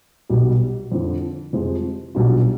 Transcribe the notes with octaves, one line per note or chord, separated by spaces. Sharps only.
B1 B2 G3
F2 D3 F3
F2 C3 F3 G#3
B1 B2 G3 D4 F4